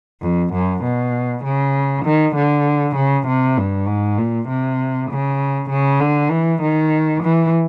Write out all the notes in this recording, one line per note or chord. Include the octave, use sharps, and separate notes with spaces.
F2
F#2
B2
C#3
D#3
D3
C#3
C3
G2
G#2
A#2
C3
C#3
C#3
D3
E3
D#3
E3